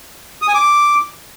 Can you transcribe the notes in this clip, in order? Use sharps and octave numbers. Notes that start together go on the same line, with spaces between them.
D#6
G#5
D6